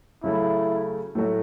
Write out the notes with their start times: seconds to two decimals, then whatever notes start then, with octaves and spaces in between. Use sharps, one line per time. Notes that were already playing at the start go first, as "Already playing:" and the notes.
0.24 C#3 F#3 A3 E4
1.15 A2 F#3 A3 F#4